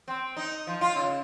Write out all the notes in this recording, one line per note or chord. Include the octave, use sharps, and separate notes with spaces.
C4
D#4
F3
F4
C#3